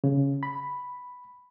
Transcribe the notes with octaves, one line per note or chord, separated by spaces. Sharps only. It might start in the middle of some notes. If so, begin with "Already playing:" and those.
C#3
B5